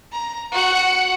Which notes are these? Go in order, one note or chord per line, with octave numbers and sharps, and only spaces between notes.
A#5
F#4 F#5